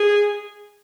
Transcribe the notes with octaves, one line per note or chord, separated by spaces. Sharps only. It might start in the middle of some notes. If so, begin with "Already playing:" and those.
Already playing: G#4